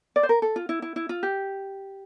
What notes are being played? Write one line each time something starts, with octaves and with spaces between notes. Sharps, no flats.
D5
C5
A#4
A4
F4
E4
E4
E4
F4
G4